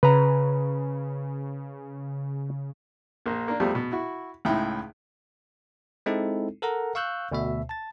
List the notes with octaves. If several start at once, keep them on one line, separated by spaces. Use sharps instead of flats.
C#3 B4 A#5
A#1 A#3
A#3 D4
E2 F3 G3 A3
B2
E4 F#4
C#2 A2 D#4 E4 G5
G#3 C4 D#4 E4 A4
A4 A#4 F#5 A#5
F5 C#6 E6 F#6 G6
D2 B2 E5
A5 A6